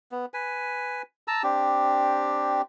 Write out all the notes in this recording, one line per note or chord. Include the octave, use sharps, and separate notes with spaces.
B3
B4 G#5
A5 A#5 E6
C4 D4 G4